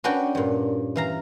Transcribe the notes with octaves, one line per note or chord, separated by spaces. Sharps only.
C#4 D4 F#4 B4 F#5 G5
G2 A#2
E3 F5 A#5